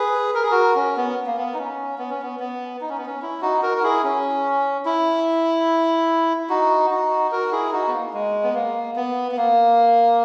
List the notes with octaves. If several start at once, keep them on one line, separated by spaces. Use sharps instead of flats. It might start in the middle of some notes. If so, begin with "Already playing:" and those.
Already playing: G#4 B4
A#4
G#4
F#4 A#4
C#4
B3
A#3
B3
D#4
C#4
B3
C#4
B3
B3
D#4
C#4
B3
C#4
E4
D#4 F#4
F#4 A#4
A#4
E4 G#4
C#4
E4
D#4 F#4
D#4 F#4
F#4 A#4
E4 G#4
D#4 F#4
B3
A#3
G#3
B3
A#3
B3
B3
A#3